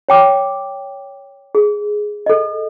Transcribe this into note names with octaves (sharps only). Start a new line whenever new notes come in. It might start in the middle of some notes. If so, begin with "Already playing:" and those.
C#5 G5 D6
G#4
A4 D#5